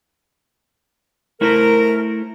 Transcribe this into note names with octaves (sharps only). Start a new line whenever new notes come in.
A3 E4 A#4 C5